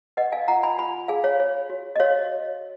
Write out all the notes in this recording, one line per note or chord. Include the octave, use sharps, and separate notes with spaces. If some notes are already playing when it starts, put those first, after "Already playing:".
B4 D#5 F#5
F5 G#5
F4 F#5 A#5
G#5 B5
F4 G#5 B5
G#4 F5 G#5
C#5 F5
C#5
F#4
D#5
F#4 C#5 F5